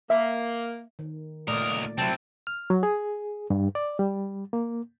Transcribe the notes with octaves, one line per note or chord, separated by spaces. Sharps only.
A#3 E5
D#3
C#2 A#2 A3 A#4 D5 D#6
C3 F#3 C4 E4 A5
F6
F#3
G#4
G2
D5
G3
A#3